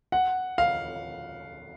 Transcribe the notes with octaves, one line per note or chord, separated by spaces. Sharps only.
F#5
F5